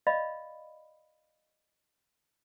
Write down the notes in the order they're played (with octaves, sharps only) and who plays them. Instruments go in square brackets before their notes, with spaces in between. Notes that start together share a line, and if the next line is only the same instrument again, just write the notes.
[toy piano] D5 D#5 F5 B5